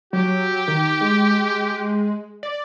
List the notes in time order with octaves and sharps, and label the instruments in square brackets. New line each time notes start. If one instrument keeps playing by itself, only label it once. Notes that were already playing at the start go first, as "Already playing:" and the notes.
[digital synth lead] F#3 [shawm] G4
[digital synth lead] D#3
G#3
D5